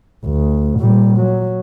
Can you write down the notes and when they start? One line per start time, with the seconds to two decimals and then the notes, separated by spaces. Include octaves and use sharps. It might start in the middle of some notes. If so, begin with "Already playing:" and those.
0.25 D2
0.80 A#2 G3
1.17 F#3